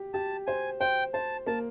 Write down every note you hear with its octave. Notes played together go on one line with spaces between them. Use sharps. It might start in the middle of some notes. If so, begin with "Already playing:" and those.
Already playing: G4
G4 A5
C5 G#5
C5 G5
C5 A5
A#3 A5